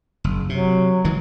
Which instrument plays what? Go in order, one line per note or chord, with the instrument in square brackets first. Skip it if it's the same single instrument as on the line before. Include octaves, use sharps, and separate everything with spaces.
[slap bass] F#1
[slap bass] C3 [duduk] F#3
[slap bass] D#3 E3 G#3